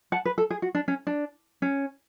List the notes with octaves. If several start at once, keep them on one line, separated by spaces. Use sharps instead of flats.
F#5 A5
B4
A4
G#4
F#4
D4
C#4
D4
C#4